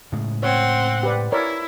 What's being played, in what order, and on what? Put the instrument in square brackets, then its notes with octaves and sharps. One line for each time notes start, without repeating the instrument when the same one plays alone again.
[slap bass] A2 C#3 G#3
[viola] C4 F#5 [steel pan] C#5
[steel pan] G4 B4 D5
[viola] E4 [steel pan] A#4 C#5 D5